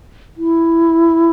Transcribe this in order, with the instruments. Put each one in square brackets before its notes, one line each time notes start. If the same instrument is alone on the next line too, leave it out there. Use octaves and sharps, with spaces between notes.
[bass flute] E4